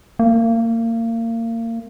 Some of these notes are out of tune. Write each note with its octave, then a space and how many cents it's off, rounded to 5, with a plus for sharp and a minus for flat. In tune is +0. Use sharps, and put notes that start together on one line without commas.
A#3 -30